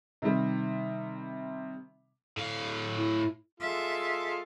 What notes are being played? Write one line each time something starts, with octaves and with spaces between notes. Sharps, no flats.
C3 D#3 G3
A2 F5
E4
G#3 F4 A4 E5